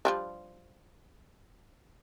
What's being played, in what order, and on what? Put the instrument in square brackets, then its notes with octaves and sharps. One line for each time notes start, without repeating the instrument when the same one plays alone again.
[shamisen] F3 G3 D4